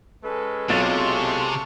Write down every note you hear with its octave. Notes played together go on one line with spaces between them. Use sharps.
G#3 C#4 A4 B4
B1 C3 F4 A5 C#6 A6